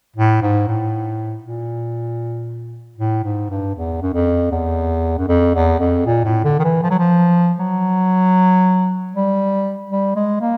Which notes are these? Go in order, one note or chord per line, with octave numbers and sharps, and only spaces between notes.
A2
G#2
A2
A#2
A2
G#2
G2
E2
F#2
F2
E2
F#2
F2
E2
F2
A#2
A2
D3
D#3
E3
F3
F#3
F3
F#3
G3
G3
G#3
A#3